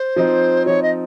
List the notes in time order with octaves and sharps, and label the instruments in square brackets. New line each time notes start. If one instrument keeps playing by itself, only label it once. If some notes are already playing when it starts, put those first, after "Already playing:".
Already playing: [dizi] C5
[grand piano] F3 C4 D#4
[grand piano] F3 C4 D#4 [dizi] C#5
[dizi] D#5